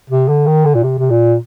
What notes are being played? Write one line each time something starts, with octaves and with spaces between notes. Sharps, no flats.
C3
D3
D#3
D3
A#2
C3
C3
A#2